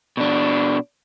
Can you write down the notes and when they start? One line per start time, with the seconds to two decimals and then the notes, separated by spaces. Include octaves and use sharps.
0.17 B2 D4